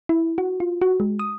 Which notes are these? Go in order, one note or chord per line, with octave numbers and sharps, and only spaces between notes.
E4
F#4
F4
F#4
G#3
D#6